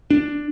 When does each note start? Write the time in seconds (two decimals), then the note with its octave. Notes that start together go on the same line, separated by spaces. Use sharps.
0.11 D4